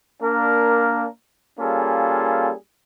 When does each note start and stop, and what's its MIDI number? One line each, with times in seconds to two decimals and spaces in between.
0.22 1.06 58
0.22 1.06 62
0.22 1.06 70
1.60 2.53 55
1.60 2.53 58
1.60 2.53 61
1.60 2.53 65
1.60 2.53 68
1.60 2.53 69